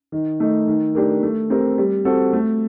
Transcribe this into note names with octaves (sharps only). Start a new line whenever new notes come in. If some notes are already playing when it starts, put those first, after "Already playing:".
D#3
A3 D#4
D#3
A3 D4 G4 A#4
A3
C4 G4 A#4
G3
C4 F#4 A4
A3